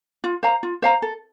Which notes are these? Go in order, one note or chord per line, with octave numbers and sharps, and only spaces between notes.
F4
C5 F5 A#5
F4
C5 F5 A#5
A4